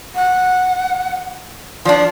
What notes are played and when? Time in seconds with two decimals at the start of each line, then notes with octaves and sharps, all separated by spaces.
0.15 F#5
1.85 F3 D4 D5